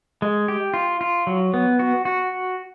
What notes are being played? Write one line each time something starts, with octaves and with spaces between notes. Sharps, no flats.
G#3
G4
F4
F4
F#3
B3
F#4
F#4